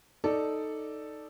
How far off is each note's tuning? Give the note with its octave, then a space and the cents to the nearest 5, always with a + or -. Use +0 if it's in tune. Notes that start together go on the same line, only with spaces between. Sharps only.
D#4 +0 A4 +0 D5 +0